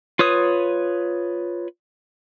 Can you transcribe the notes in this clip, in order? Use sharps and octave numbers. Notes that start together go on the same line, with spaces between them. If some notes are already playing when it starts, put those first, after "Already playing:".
F4 B4 C#5 D#6